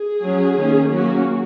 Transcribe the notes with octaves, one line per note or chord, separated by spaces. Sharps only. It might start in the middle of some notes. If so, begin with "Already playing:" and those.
Already playing: G#4
F#3 C#4
D#3 A#3 C#4
F#3 A#3 C#4 F#4